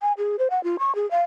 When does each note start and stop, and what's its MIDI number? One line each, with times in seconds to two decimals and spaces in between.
0.02 0.13 80
0.18 0.36 68
0.39 0.48 72
0.50 0.62 78
0.64 0.77 65
0.79 0.95 85
0.95 1.09 68
1.11 1.23 77